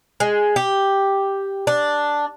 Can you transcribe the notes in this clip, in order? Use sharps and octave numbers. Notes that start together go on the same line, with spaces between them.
G#3
G4
D4